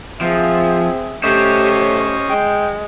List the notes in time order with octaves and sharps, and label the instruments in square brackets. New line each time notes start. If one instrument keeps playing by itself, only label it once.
[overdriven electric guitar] F3 [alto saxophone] C4 [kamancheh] G#4 E5
[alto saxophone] A3 [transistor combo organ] C#4 D#5 [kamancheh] G4 C#5 [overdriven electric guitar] C5 E5
[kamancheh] G#3 [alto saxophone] G5